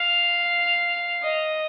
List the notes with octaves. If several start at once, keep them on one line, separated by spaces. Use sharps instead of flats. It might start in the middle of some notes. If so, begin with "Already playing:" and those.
Already playing: F5
D#5